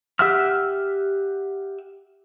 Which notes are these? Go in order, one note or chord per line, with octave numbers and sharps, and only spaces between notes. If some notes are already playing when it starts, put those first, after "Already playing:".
G4 E5 F#5 E6 F6